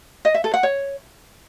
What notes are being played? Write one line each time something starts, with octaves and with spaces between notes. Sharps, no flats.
D#5
E5
A4
F#5
C#5